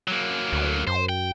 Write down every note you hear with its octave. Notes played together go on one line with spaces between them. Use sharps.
F#3 A#3
D2
F#2 C5
G5